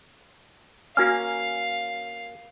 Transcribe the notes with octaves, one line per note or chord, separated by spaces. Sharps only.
A#3 C#4 F#4 F5 G#5 F6